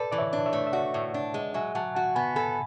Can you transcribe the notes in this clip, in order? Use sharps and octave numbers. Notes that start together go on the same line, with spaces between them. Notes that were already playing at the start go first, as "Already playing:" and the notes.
Already playing: A4 B4 D5
E3 D5
C#5 E5
D4
C#5 E5
A3
E5
F#4 D5 F#5
A2
D4
G#3
F#3 E5 G#5
F#3 F#5 A5
F#4 F#5 A5
B3 G#5 B5
A4 G#5 B5